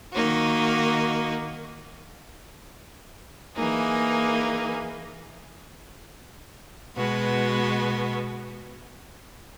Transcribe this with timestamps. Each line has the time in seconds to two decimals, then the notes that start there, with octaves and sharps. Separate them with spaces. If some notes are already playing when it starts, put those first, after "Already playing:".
0.12 D#3 A#3 D#4 F#4
3.54 E3 A#3 D#4 G#4
6.97 B2 G#3 B3 F#4